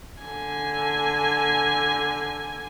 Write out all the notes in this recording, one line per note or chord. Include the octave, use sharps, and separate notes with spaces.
D3 G#5